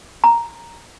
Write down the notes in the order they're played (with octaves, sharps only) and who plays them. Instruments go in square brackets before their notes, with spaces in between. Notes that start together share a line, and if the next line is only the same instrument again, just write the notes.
[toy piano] A#5